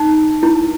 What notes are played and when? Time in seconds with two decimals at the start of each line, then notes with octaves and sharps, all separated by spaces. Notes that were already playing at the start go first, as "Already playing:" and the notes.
Already playing: D#4
0.43 E4